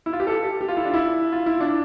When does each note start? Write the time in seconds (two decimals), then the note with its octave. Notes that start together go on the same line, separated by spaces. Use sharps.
0.06 E4
0.13 F4
0.20 G4
0.27 A4
0.44 G4
0.61 G4
0.69 F4
0.77 E4
0.85 D4
0.94 E4
1.32 F4
1.46 E4
1.60 D4